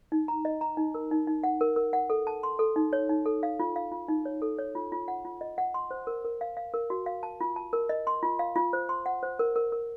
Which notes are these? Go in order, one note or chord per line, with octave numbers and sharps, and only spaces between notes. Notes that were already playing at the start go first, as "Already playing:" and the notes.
D#4
A#5
D#5
A#5
D#4
A#4
D#4
D#4
F#5
A#4
A#4
F#5
A4
A5
C6
A4
D#4
C#5
D#4
A4
F5
F4
F5
F4
D#4
C#5
A4
C#5
F4
F4
F#5
F4
D#5
F#5
C6
C5
A#4
A#4
F5
F5
A#4
F#4
F5
A5
F4
A5
A#4
D#5
C6
F4
F5
F4
C5
C6
F#5
C5
A#4
A#4
A#4